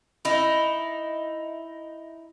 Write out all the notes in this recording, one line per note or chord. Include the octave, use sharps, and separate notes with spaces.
D#4 E4